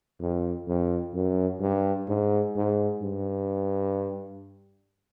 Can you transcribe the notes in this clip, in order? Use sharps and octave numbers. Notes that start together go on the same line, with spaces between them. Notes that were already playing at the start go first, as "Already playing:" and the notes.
F2
F2
F#2
G2
G#2
G#2
G2